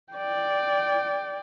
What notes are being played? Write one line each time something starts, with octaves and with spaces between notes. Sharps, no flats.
D5 G5